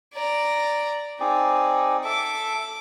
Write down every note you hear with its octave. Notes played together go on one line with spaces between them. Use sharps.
D5 A#5
C4 D#4 G#4 D5
A4 E5 D6